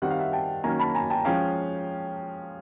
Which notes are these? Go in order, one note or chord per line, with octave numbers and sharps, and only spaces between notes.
D#3 G3 C4 F#5
F5
E5 F#5
G5 A5
D#3 F#3 A#3 C#4 G#5 A#5
A5 B5
G#5 A#5
G5 A5
F3 G#3 C#4 F5 G5